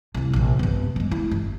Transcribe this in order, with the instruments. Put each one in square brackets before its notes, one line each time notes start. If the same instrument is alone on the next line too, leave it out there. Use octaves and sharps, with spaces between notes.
[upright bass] C2 F2
A#1 C3
G2 B3
G3 G#3
E4
G1